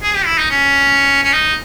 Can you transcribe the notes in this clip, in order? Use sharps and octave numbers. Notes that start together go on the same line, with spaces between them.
G#4
G4
E4
D#4
C#4
C#4
D#4